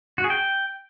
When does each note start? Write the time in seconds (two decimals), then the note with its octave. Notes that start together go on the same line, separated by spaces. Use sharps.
0.18 F#4
0.24 G#4
0.30 G5